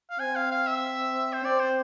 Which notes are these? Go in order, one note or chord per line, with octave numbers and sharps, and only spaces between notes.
F5
C4 G#5
F5
F5
E5
C5
C4 D5
C5